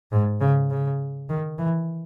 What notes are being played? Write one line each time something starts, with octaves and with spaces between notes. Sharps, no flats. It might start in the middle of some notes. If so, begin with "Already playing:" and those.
G#2
C#3
C#3
D#3
E3